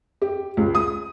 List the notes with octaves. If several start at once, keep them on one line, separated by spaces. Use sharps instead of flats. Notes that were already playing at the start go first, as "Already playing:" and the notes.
G4
C#2
D#6